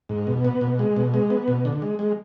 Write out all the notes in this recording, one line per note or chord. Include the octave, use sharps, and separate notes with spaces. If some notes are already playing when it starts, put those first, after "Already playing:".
G#2
B2
B3
B2
G#3
B2
G#3
B3
B2
D3
G#3
G#3